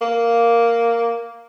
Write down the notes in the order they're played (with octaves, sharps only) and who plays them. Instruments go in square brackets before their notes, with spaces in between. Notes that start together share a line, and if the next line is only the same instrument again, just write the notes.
[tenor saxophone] A#3